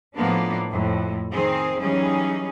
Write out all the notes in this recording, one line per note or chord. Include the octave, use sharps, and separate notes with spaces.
A2 F3 A#3 B3 D4
F2 A2
D#3 C4 G#4
E3 F#3 G3 C#4 D#4 G#4